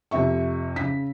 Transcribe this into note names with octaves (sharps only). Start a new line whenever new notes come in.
F2 C3 E5 C#6
C#3 B6